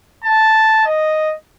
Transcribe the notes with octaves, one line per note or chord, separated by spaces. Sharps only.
A5
D#5